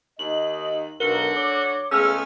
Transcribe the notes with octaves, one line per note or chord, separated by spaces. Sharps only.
D#2 D#5 F#7
B1 D3 F#4 A#4 G7
C#5 D6
C#2 A3 B3 C#4 G#4 F5 E6 F6